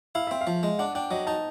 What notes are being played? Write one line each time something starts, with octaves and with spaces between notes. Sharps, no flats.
E4 F5
C4 E5
F5
F3
G#3
D4 F#5
D4 G5
F#3 D#5
D#4 A5